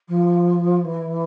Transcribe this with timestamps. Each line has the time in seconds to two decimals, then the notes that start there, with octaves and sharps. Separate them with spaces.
0.08 F3
0.84 E3